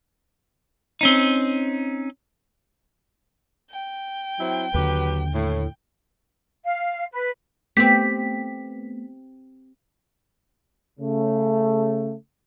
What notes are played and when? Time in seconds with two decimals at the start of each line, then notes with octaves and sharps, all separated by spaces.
1.01 C4 C#4 D#4
3.71 G5
4.40 F#3 C4 E4
4.74 D#2 D3 F#3 G4 B4
5.34 A2
6.64 F5
7.11 B4
7.77 A3 B3 C4 G4 B6
11.00 C#3 A3